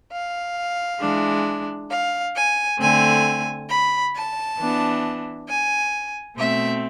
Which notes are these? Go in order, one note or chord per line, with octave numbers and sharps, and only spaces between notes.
F5
E3 G#3 D4
F5
G#5
D3 A3 C4 G#5
B5
A5
E3 B3 D4
G#5
B2 A3 C4 E5